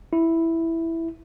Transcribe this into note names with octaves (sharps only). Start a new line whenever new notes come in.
E4